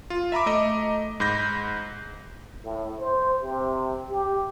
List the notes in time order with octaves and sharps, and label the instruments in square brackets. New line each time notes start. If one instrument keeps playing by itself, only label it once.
[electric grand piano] F4
E5 A#5 B5 D6
A3 D#5 A#5
G#2 B5 G6 A#6
[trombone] A2
C5
C3
G4